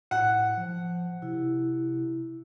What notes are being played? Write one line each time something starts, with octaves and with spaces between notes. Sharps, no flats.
A2 F#5
F3
C3 E4